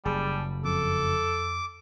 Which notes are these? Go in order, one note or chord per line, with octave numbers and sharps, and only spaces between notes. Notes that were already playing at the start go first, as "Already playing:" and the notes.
F#1 G3 G#4 A5
F2 A4 D6